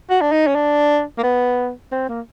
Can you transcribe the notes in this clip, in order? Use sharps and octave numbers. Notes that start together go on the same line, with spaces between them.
F#4
D4
D#4
C#4
D4
A#3
B3
C4
A#3